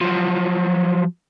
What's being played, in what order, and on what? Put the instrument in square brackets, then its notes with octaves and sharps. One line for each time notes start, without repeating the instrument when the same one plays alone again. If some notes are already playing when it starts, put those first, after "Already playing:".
[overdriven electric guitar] F3 F#3